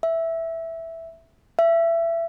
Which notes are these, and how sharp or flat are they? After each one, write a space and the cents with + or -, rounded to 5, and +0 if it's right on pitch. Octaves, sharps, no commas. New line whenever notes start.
E5 +0
E5 +25